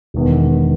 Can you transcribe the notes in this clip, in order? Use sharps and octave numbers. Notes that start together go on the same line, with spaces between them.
E1 E2 D#3